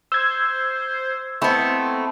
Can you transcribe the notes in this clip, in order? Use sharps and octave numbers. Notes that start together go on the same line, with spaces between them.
C5 E6 G#6
A3 B3 C4 E4 C5 D#5